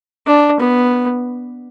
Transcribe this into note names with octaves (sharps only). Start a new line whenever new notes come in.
D4
B3